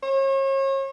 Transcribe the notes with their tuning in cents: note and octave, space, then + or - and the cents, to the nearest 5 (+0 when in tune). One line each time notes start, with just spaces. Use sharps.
C#5 -40